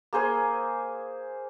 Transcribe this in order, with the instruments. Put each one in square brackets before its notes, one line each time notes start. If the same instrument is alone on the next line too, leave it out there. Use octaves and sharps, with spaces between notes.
[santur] A#3 G#4 C5 G#5